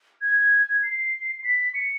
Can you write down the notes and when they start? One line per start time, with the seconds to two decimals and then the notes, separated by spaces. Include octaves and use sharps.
0.22 G#6
0.83 C7
1.44 B6
1.74 C#7